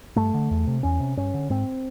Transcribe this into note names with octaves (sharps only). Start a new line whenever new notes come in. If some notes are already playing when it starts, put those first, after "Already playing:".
G2 A3
D3
E2
C3
E2 C#4
C3
G2 C#4
D3
G#2 C4